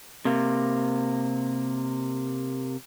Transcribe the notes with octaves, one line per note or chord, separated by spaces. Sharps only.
C3 A#3